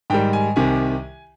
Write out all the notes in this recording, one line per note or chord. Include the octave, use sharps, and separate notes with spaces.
G#2 D#3 G3 G5
G#5
C2 C3 D#3 G#5